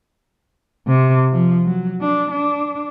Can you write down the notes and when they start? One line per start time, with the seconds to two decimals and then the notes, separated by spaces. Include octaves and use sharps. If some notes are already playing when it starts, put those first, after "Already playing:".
0.87 C3
1.33 F3
1.66 F#3
2.01 D4
2.31 D4